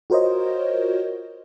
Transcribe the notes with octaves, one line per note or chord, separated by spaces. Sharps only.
F4 F#4 A#4 C5 C#5 D#5